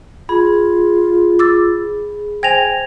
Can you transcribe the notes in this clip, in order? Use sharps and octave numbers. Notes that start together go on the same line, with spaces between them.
F4 G#4 B5
D6 E6 A6
C5 G5 G#5 G#6 A#6 F7